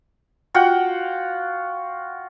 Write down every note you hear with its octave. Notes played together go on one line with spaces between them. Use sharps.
F4 F#4 F#5 G5